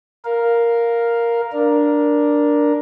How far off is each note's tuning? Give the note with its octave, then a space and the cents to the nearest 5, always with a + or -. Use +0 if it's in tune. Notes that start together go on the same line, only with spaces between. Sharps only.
A#4 +5 F5 +0
D4 +0 A#4 +10